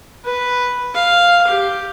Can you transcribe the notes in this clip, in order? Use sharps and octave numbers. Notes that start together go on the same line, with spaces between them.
B4
F5
G4